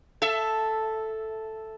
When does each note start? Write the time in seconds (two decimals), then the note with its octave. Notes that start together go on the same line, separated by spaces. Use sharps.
0.22 A4 E5